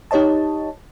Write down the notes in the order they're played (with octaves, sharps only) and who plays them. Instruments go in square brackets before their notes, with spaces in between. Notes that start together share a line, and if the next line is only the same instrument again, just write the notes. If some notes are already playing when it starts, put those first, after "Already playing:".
[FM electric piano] D#4 G4 C#5 D#5 A5